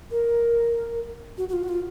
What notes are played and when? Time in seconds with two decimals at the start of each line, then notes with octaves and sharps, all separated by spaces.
0.11 A#4
1.38 F#4
1.49 F#4
1.53 F4
1.64 F#4
1.69 F4